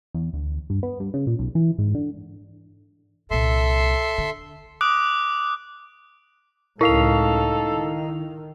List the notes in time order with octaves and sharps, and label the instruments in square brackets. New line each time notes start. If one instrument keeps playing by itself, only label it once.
[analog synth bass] E2
D2
G2
B3
G2
C#3
A#2
B1
E3
G#2
D3
[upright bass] C2 A#2 [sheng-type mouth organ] A4 E5 C6
[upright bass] D3
[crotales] D6 D#6 F#6 D7
[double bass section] C#2 A2 [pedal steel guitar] D#4 F5 [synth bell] E4 F7 [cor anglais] A4
[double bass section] D#3